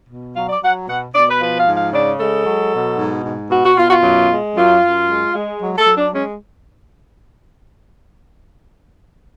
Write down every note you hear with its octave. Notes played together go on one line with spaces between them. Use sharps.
B2
F#3 F5
D5
F#3 F#5
B2 F#5
B2 D5
B4
F3 B4
F5
G#2
F5
C#3 D5
G#3 A4
F#3
B2
G#2
G#2
B2 F#4
F#4
B2 F4
F#4
F4
F#2
G#3
F#2 F4
F#2
G#3
G#3
F#3
A4
F#3
D4
G#3 C#4